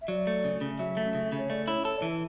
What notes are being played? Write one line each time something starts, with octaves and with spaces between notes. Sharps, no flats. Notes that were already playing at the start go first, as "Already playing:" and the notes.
E5
F#3 D5
A3
C#3
C#3
F#3 E5
A3
C#3
C#3
C#5
A3 D5
E4 C#5
A4 C#5
D5
E3 E5